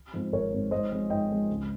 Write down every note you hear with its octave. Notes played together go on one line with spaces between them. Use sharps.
G#2 F3 C4
G#1 A#4 C#5
G#2 F3 C4
G#2 C5 D#5
F3 G#3 C4
G#2 D#5 G5
F3 G#3 C4
C#2